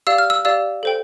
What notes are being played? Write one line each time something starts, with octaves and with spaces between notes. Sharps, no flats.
G4 D5 F5 E6
F6
E6
G4 D5 F5 E6
A4 C5 G5